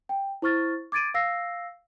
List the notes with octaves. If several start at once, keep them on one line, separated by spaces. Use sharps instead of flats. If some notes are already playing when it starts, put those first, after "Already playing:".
G5
E4 C5 C#6 F6 A6
D6 G#6 A6 D7 D#7
F5 E6 A#6 C7